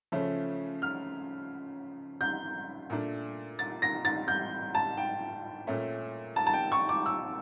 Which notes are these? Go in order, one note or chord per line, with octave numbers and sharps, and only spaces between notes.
C#3 F3 A3 C#4
F6
G6
A#2 A3 D4
A6
A#6
A6
G6
A5
G5
A#2 A3 C#4
A5
A5
G5
C#6
D6
E6